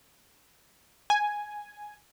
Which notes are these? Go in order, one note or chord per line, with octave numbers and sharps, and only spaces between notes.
G#5